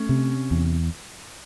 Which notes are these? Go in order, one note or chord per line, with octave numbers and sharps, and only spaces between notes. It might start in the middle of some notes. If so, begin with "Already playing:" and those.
Already playing: A3 C#4
C3
E2